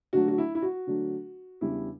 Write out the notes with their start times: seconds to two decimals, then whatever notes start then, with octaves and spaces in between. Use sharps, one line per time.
0.13 D3 F#3 A3 D4 F#4
0.28 F#4
0.38 E4
0.55 E4
0.62 F#4
0.87 D3 F#3 A3 D4
1.61 E2 C#3 G3 B3 D4 E4